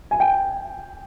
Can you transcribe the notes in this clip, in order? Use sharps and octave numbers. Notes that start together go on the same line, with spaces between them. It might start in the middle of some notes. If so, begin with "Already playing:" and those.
G#5
G5